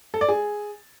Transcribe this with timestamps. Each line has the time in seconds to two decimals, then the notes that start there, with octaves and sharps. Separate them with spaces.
0.14 A4
0.21 D5
0.29 G#4